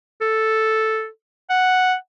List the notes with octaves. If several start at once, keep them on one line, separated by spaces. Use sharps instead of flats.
A4
F#5